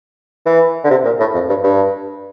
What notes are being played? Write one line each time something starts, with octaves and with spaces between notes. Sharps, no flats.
E3
D3
C3
A#2
A2
F2
G2
G2